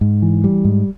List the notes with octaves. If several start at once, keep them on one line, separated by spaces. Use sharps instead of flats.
G#2
E3
G3
G#2